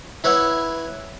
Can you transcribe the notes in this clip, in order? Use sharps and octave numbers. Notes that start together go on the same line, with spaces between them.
E4 B4 C#5 E5 F#5